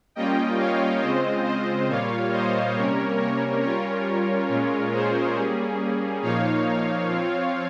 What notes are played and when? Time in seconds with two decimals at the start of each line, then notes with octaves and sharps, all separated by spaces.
0.15 G3 A#3 C#4 F4 D#5 G5
0.58 C#5 F5
1.02 C#3 G#3 C4 F4 C5 D#5
1.45 C5 D#5
1.89 A#2 G3 A#3 F4 C#5 F5
2.32 C5 D#5
2.75 C3 G3 A#3 C#4 A#4 C#5
3.18 A#4 C#5
3.62 G3 C#4 F4 A#4 C#5
4.49 A#2 G#3 C#4 F4
4.93 G#4 C5
5.36 G3 A#3 C#4 G#4
6.22 A#2 F3 A#3 D#4 C#5 F5
7.09 F3 C4 F4